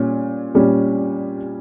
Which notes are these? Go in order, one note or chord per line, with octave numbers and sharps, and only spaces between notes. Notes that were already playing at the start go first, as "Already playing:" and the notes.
Already playing: A#2 G3 C#4
A#2 G3 C#4